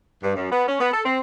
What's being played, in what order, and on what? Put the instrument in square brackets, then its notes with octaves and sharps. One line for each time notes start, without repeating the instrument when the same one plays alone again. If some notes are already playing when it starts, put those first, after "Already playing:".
[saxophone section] G2
F#2
B3
C#4
B3
A4
C4